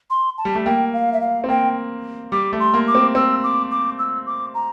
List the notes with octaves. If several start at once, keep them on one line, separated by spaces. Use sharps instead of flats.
C6
A5
G3
A3
A#3 G5
F5
E5
F5
C4
A#3 G5
G3 D6
A3
C6
A#3
D6
C4
C4 E6
D6
D6
E6
D6
A#5